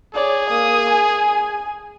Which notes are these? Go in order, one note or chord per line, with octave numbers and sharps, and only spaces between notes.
G#4 C#5 D5
A#3 D#6
G#5